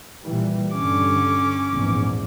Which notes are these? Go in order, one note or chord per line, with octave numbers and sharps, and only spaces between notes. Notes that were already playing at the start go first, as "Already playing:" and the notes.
A#2 E3 G3
G2 D3 C#4 D6
A#1 E2 G#2